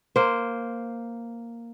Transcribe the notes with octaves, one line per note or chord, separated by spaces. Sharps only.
A#3 C5